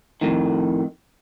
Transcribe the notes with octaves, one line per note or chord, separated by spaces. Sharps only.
F2 A2 D#3